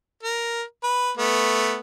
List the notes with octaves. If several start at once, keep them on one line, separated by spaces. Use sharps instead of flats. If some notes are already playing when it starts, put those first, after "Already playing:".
A#4
B4
A3 B3